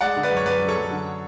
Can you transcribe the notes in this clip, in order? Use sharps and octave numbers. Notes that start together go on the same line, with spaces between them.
G#3 D5 F#5
D3
B4 D5
F#2
C#5
F#2 B4 D5
F#2
A4 C#5
F#2
D3